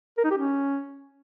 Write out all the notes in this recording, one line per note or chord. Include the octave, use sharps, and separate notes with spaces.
A#4
D#4
G4
C#4